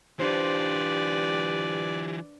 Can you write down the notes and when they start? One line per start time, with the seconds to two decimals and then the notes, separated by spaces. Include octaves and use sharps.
0.19 E3 D4 F4 G4 B4 C5 D5